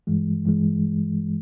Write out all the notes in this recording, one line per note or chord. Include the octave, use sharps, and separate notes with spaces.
G2 E3 G#3
G2 E3 G#3